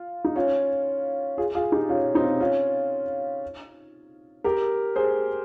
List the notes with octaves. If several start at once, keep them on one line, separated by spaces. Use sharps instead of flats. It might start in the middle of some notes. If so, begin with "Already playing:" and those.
Already playing: F4
D#4
C#4 F4
F4 G#4
F4 G#4
D#4 G4
C#4 F4
C4 D#4
C#4 F4
G4 A#4
G#4 C5